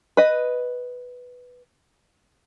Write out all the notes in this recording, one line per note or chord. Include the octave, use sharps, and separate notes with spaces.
B4 D#5